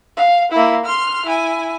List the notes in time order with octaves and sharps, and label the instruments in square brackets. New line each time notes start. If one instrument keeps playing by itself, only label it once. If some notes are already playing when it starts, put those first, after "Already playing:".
[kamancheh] F5
A#3 E4
C6 F6
E4 G#5